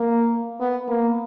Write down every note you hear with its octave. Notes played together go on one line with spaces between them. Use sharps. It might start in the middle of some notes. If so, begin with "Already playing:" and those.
Already playing: A#3
B3
A#3